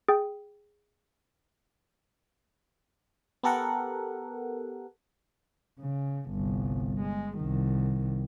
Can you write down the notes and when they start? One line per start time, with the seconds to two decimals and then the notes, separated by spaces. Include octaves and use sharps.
0.08 G#4 G5
3.43 B3 G4 A4 A#4 F#5
5.80 C#3
6.31 G1 C2
7.01 G#3
7.38 C2 D#3